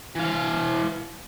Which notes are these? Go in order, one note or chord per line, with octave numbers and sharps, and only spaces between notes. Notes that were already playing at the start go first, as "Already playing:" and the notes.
E3 F5